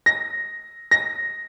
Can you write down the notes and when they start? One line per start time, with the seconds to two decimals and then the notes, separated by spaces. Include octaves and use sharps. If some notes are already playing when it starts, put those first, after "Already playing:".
0.06 A#6
0.91 A#6